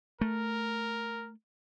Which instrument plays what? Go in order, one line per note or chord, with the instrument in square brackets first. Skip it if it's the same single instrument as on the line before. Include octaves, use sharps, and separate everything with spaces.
[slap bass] A3 [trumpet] A#4